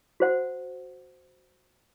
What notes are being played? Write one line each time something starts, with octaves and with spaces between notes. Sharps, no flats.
F#4 C5 F#5